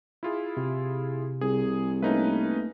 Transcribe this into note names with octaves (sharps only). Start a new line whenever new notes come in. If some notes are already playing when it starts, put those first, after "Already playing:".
E4 F4 G#4
C3
C2 G#4
A3 A#3 C#4 D#4 B4